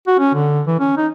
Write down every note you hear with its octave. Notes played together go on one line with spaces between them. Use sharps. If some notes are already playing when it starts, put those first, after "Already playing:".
F#4
C#4
D3
E3
C#4
D#4